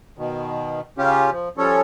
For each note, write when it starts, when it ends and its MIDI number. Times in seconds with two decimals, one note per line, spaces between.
0.18 0.81 47
0.18 0.81 51
0.98 1.30 49
0.98 1.30 61
0.98 1.30 65
0.98 1.30 67
1.31 1.49 53
1.57 1.81 53
1.57 1.81 55
1.57 1.81 61
1.57 1.81 69
1.57 1.81 73